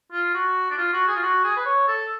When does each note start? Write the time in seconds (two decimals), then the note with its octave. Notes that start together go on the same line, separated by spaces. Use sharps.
0.12 F4
0.34 F#4
0.70 D4
0.78 F4
0.93 F#4
1.08 G#4
1.16 F4
1.23 F#4
1.44 G#4
1.56 B4
1.66 C#5
1.88 A4